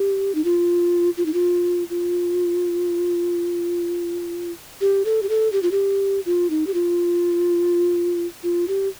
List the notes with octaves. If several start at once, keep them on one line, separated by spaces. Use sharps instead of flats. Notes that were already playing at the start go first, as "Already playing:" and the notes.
Already playing: G4
D#4
F4
F4
D#4
F4
F4
G4
A4
G4
A4
G4
F4
G4
F4
D#4
G4
F4
F4
G4